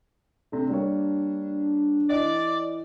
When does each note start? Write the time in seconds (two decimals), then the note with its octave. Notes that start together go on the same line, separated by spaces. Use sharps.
0.52 C3 A3 D4
0.69 G3 A#3 C#5
2.10 E3 D5 D#5